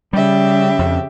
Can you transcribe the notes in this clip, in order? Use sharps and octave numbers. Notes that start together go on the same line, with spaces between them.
C#3 G3 G4 E5
F2